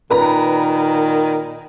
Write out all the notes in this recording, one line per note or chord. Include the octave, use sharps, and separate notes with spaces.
A#2 D#3 B4 A#5